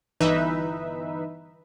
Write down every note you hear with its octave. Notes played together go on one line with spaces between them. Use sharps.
G1 E3 D#4 B4 E5